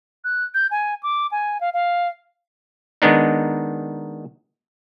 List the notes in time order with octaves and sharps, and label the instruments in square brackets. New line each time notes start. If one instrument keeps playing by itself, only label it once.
[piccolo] F#6
G6
G#5
D6
G#5
F5
F5
[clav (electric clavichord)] D#3 G#3 B3 D4 D#4